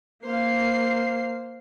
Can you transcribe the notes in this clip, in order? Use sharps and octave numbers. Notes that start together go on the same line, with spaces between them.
A#3 C5 F5 C7